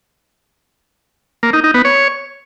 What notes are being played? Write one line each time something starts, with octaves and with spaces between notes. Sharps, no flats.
A#3
D#4
D#4
B3
C#5